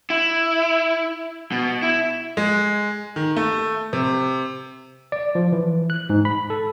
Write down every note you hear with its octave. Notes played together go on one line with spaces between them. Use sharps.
E4
B2
E4
G#3
D#3
A3
C3
D5
F3
E3
F#6
G#2
B5
A4